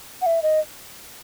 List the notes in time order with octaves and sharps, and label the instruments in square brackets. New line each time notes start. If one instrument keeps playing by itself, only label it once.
[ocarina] F#5
E5
D#5